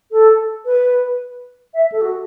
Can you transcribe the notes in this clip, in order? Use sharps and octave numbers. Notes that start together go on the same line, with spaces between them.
A4
B4
E5
A4
F#4